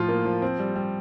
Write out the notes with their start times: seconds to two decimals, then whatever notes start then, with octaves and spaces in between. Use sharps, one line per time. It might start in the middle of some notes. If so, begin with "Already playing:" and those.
Already playing: A2 F3 F4
0.09 A#3
0.25 F3
0.42 C4
0.59 G3
0.76 G3